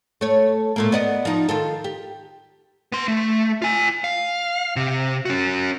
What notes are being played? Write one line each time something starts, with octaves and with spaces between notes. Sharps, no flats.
A3 C#5
A#2 A3 A#3
B3 D5 D#5
F3 D#4
D#3 F4 A4
G4
B3 C6
A3
F4 G#5
F5
C3
C#4 F#4